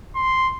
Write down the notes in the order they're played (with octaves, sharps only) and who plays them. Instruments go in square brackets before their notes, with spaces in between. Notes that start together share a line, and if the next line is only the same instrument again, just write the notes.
[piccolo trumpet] C6